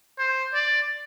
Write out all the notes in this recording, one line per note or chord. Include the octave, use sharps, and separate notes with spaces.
C5
D5